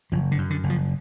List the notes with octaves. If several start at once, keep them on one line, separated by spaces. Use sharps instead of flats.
F#1 F3
D3
F#2
D3
F#1
F3